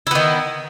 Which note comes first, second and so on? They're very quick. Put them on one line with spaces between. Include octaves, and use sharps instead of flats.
E4 B3 D#3